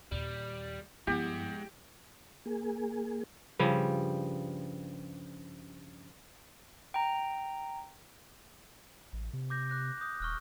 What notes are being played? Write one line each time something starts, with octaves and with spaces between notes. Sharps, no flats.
D#2 A#2 G3 F7
G2 F3 G#3 B3 E4 G4 F#5
A#3 G#4
G2 C#3 F3 G3
G5 A#5
A1
C3
D6 G6 A#6
D6 F#6 A#6
D#6 G6
D#1 C#6 F6 F#6